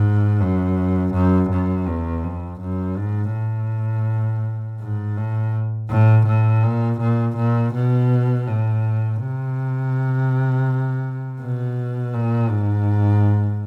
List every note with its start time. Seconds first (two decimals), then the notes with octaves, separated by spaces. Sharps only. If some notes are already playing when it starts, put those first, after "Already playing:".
Already playing: G#2
0.41 F#2
1.14 F#2
1.50 F#2
1.87 E2
2.23 F2
2.60 F#2
2.97 G#2
3.33 A2
4.80 G#2
5.17 A2
5.90 A2
6.26 A2
6.63 A#2
7.00 A#2
7.36 A#2
7.74 B2
8.47 A2
9.20 C3
11.40 B2
12.14 A#2
12.50 G#2